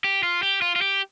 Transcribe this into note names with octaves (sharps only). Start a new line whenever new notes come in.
G4
F4
G4
F4
F4
G4